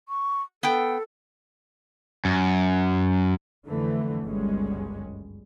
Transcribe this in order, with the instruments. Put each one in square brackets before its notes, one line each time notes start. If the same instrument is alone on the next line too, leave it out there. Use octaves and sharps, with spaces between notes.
[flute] C#6
[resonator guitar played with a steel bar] B3 G5 [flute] A4
[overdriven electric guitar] F#2
[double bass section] F2 D3 E3 A3
G1 C#2 F#2 G3 G#3 C#4